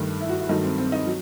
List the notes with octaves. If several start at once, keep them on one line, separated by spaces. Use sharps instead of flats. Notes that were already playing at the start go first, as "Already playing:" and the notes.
Already playing: G2 D#3 A3
E4
F#4
E4
G2 D#3 F#3 A3 D#4
C4
C4
D#4
F#3